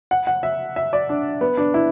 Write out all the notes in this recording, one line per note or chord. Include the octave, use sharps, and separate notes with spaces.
F#5
F#5
E5
E5
D5
D4
B3
D4
E4